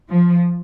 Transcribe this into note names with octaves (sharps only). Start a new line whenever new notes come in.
F3